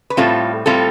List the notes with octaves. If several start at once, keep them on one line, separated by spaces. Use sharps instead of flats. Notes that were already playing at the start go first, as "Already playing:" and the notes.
B4
A2 G3 C4 F4 A4
A2 G3 C4 F4 A4